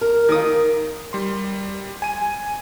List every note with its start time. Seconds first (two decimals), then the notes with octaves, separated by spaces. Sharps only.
0.01 A#4
0.29 D#3 D#6
1.13 G3 C6
2.02 G#5 D#7